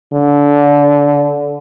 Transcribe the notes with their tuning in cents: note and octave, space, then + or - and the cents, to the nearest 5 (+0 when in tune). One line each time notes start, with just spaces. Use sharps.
D3 -25